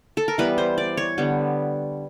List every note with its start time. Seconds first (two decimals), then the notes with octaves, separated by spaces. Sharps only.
0.17 A4
0.28 A#4
0.38 E3 G3 B3 B4
0.58 C5
0.78 D5
0.97 C#5
1.18 D3 G3 B3